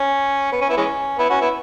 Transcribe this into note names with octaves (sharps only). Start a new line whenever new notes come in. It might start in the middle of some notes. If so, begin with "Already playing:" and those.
Already playing: C#4
B3
C#4
B3 E4
E3 G#3 C#4
B3 E4
C#4 F#4
B3 E4